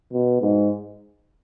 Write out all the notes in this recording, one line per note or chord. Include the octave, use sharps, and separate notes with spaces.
B2
G#2